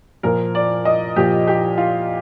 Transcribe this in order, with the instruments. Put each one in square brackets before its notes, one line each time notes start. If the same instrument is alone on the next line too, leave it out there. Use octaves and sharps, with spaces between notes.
[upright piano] A#2 F3 A#4
D5
D#5
A#2 F3 G4
G4
F4